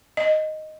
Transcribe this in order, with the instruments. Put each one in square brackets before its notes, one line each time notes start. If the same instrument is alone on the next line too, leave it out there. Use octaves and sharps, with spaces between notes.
[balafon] D#5